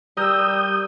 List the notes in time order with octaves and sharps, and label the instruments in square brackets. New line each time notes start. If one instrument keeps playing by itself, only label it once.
[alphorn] G3 [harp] A#4 E6 [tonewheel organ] D#6 G6